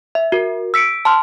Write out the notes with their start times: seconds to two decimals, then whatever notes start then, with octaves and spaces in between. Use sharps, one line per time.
0.15 E5
0.32 F#4 A#4
0.74 E6 B6 C#7 D7
1.05 A5 C6 F6